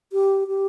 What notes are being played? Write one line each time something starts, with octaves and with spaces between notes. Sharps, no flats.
G4
G4